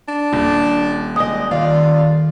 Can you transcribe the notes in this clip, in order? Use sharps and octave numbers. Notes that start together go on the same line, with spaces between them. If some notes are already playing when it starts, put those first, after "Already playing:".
D4
D#1
G#3 D#5 G5 D#6
D#3 F4 D5 F5